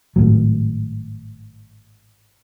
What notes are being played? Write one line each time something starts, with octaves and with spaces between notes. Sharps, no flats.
G#1 D#2 A2 F#3